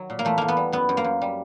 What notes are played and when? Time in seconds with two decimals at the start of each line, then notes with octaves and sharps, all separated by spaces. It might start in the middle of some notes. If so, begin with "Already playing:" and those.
Already playing: D#3 F#3
0.10 A#2
0.19 A#3
0.25 E2 A3
0.38 E2 A#3
0.48 B3
0.57 G3
0.72 F#2 B3
0.89 F#2
0.97 A#3
1.04 F#2
1.22 G3